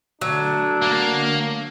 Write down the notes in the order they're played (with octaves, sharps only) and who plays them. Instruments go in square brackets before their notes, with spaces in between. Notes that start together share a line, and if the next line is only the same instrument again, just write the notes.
[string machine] D3 A3 [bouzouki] F#3 [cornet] D4
[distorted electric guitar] A#3 A#4